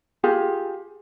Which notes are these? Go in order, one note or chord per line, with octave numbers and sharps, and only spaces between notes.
F4 G4 G#4